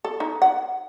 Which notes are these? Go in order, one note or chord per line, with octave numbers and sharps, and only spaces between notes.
A4
D#4
F#5